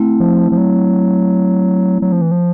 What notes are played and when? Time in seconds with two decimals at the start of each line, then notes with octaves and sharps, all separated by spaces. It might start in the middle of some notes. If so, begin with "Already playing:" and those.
Already playing: A3 C4 E4
0.20 F3
0.52 F3
0.57 F#3
2.02 F#3
2.12 F3
2.22 E3
2.31 F3